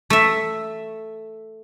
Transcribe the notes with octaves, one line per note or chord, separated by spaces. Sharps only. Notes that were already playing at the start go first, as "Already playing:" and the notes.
A3 E5